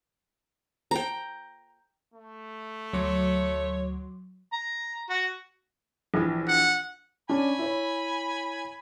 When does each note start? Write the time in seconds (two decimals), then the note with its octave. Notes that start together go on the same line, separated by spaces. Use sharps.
0.91 G5 A#5
2.14 A3
2.93 D2 F#3 C#5 C6 D6
4.53 A#5
5.10 F#4
6.14 A#1 E3
6.48 F#5
7.30 C#4 D4 G#5 B5
7.59 E4 C#5